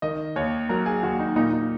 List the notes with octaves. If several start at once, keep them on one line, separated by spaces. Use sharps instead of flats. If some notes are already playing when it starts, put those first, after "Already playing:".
D#3 D#5
D#2 C#5
F#3 A#4
G#4
D#2 F#4
D#4
A#2 D#4
D#4